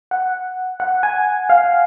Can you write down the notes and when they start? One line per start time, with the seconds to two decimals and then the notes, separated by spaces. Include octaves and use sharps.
0.11 F#5
0.80 F#5
1.03 G#5
1.50 F5